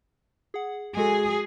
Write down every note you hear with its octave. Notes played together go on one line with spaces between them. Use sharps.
G#4 F#5
G#3 F#4 G#4 A4